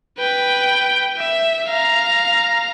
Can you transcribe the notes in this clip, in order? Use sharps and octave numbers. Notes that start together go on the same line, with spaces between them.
B4 G5
E5
F5 A#5